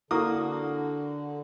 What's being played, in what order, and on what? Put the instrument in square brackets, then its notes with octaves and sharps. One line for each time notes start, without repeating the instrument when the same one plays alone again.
[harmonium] D3 [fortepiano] A#3 F#4 D#6 [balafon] E4